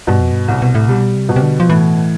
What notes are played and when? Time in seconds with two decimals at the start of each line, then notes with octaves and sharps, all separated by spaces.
0.07 G2 B2
0.20 F2
0.32 G2
0.48 C2 A2
0.62 B2
0.75 A2
0.88 B2 G3
1.15 C3
1.29 B2
1.36 C3
1.43 D3
1.60 F3
1.69 A2 E3